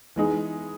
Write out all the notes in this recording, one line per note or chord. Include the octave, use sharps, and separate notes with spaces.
E3 G#3 D#4 G#4